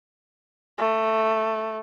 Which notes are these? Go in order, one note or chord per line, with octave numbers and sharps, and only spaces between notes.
A3